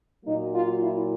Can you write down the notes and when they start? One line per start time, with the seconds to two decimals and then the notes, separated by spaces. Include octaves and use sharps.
0.24 A#2 F#3 A#3 D#4
0.53 F4
0.81 E4